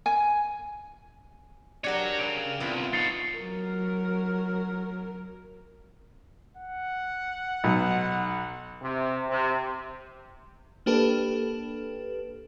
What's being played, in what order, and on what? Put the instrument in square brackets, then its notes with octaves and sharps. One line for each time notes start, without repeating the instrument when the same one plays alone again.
[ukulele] G#5
[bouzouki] D4 G4 A#4 [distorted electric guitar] C#5 F#5
[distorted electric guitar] C#3 [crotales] D7 F7
[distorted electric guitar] C2 [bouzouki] B3 F4
[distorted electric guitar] D#4 C#5 [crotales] A6 C7 C#7
[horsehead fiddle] F#3 A#4
[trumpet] F#5
[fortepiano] B1
[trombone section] C3
C3
[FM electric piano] A#3 D4 G4 A4 B4